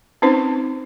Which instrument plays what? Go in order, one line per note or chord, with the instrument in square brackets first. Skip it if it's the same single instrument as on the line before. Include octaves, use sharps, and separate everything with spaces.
[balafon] C4 C#4 D#4 B4 C5